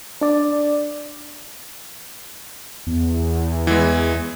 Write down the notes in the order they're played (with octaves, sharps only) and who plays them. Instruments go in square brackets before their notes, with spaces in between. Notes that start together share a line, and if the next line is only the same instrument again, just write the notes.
[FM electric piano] D4 D5
[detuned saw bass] E2
[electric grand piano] E3 G#3